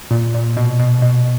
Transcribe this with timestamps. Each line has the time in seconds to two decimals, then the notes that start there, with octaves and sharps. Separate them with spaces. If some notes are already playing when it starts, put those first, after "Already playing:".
0.11 A#2
0.34 A#2
0.57 B2
0.80 B2
1.02 B2